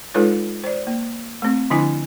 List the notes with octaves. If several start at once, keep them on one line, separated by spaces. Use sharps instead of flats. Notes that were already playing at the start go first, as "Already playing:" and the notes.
G#3 D#4 F4 A4 B4 C#5
C5 D5
A#3
A3 C4
D3 F3 D4 E4 G#5